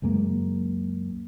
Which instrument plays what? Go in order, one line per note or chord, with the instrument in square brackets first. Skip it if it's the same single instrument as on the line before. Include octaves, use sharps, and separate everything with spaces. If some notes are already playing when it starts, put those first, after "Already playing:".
[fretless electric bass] C#2 F#2 G#3 A#3